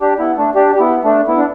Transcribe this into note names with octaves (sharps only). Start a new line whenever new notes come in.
D4 G4
B3 E4
A3 D4
D4 G4
G4
B3 E4
A3 D4
B3 E4
D4